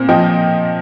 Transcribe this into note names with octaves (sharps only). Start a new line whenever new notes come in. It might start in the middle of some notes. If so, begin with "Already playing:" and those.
Already playing: A#2 C4
F3 D#5 G5